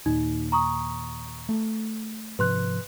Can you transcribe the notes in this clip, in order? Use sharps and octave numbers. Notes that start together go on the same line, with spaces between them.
D#2 A#2 D#4
A#5 C#6 D#6
A3
G#2 C3 F3 B4 C6 F#6